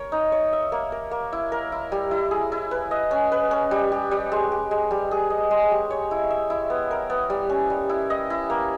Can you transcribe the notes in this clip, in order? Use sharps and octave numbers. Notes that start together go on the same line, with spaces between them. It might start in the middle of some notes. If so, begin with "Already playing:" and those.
Already playing: A#4 C#5
D#4
C#5
E5
A#3
A#4
A#3
E4
A#4
E4
G3
E4
G#4
E4
B4
D#5
C#4
B4
C#4
G3
G4
G3
G#3
G4
G#3
G3
G#4
D#5
G#3
G4
C#5
E4
E5
E4
B3
A#4
B3
G3
C#4
G3
E4
D#5
E4
A#3